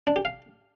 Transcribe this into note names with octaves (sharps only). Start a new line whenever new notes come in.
D4
G4
F5